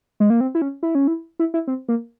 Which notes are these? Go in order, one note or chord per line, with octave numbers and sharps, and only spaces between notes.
G#3
A#3
C4
E4
C#4
E4
C#4
E4
E4
E4
C4
A#3